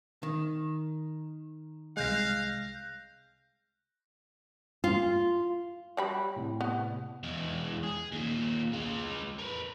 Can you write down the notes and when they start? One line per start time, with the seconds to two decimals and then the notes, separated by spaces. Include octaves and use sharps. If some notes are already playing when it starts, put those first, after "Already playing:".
0.23 D#3
1.97 C2 G#3 F5 F#6 G6 A#6
4.84 F4
5.97 F#3 G3 B5
6.36 A2 C3
6.61 B3
7.24 E2 G#3
7.84 G#4
8.12 D#2 A#2
8.73 G#3 F4
9.39 A#4 B4